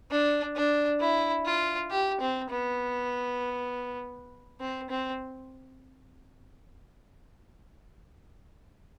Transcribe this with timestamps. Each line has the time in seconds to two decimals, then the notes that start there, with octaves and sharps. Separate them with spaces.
0.11 D4
0.56 D4
1.00 E4
1.45 F4
1.91 G4
2.20 C4
2.50 B3
4.60 C4
4.90 C4